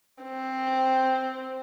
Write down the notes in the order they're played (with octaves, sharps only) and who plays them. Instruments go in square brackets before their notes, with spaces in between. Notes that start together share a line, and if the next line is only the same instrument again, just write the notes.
[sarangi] C4